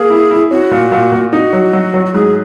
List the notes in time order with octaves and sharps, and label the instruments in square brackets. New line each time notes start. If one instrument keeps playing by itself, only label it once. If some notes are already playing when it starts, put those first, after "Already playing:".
Already playing: [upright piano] A#3 [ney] G#4
[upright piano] E4
E4
[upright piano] C#4 [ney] F#4
[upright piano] A#2
A#2
A#2
[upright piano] D#4 [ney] F#4
[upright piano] F#3
F#3
F#3
[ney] F#4
[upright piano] G#2 [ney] G#4